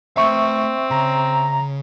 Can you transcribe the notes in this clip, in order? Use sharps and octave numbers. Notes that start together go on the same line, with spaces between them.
A3 C4 E5 A#5 C#6
C#3 A#5